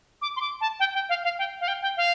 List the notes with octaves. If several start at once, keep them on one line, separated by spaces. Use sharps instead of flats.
D6
C6
D6
A5
G5
G5
F5
F5
G5
F5
G5
G5
F5